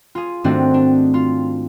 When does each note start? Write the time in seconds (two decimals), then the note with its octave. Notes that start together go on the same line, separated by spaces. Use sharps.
0.15 F4 G#4
0.44 G#2 D#3 A3 C4 D4 F#4
0.74 D4
1.14 F4